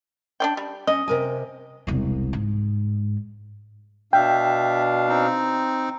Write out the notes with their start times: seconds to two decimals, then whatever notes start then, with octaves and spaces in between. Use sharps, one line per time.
0.40 D4 D5 G5
0.57 G3
0.87 C#4 D#5
1.08 C3 A#4 G#5
1.87 E1 C2
2.33 G#2
4.13 B2 D4 E5 F5 G5
5.09 C4 D#4